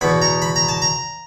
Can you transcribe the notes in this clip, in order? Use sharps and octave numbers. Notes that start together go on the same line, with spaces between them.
E2 B2 B5
A#5
B5
A#5
A5
A#5